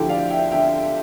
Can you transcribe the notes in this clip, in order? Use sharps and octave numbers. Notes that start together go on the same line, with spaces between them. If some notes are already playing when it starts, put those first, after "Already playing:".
Already playing: D2 D3 F3 E4 G4
D5 F5
E5 G5
D3 E5 G5